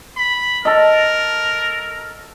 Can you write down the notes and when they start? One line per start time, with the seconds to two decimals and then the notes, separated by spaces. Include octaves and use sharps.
0.17 B5
0.65 A4 A#4 D#5